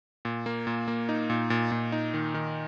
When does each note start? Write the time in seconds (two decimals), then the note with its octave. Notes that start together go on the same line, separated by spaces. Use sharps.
0.25 A#2
0.46 A#3
0.67 A#2
0.88 A#3
1.09 D#4
1.30 A#2
1.50 A#2
1.72 A#2
1.92 D#4
2.14 D#3
2.34 D#3